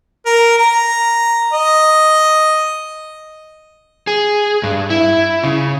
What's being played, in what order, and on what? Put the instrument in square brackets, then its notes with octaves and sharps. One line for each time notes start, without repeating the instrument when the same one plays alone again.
[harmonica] A#4
A#5
D#5
[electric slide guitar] G#4
G2
E4
C#3